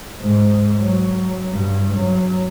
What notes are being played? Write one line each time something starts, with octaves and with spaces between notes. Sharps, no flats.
G#2
F#3
G2
F#3